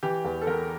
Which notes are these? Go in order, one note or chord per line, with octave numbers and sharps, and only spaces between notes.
E3 G4
E2
A4
E2 A#4